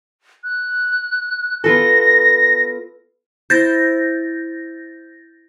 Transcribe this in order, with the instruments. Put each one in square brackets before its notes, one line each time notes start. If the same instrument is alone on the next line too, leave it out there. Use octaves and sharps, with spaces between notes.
[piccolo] F#6
[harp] B3 F4 A4 [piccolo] A#6
[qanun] E4 C5 [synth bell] G6 A6 A#6